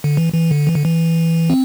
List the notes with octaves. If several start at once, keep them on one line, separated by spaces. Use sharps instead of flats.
D3
E3
E3
D3
E3
D3
E3
C4